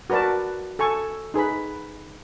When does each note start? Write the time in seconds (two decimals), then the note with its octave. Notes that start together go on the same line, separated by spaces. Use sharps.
0.10 F#4 A#4 B4 D5 A5
0.79 A4 G#5 C#6
1.34 D#4 G#4 B4 B5